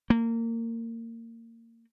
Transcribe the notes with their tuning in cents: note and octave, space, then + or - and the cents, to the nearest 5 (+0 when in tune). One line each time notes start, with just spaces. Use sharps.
A#3 -25